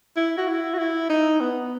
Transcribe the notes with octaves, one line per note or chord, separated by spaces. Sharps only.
E4
F#4
E4
F#4
E4
D#4
B3